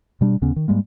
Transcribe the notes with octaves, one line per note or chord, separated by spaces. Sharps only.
B2 G3 D4
D#2 C#3 B3 C#4
D#3
G#2 G3 G#3 A#3